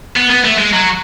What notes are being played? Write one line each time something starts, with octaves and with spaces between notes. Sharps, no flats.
B3
B3
A3
G#3
F#3